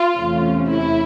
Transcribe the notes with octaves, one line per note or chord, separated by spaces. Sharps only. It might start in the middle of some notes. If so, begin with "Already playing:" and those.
Already playing: F4
E2 C3 E3 A3 C#4
E4